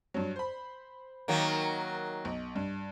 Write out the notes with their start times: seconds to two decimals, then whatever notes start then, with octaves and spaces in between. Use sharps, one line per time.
0.14 G2 F#3
0.36 C5 B5
1.28 D#3 F#3 A#3
2.25 B1
2.56 G2